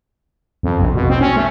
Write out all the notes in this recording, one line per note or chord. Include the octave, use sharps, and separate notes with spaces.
F2
A#1
B2
C4
C#4
A3